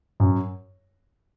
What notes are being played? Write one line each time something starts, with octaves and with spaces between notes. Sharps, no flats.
F#2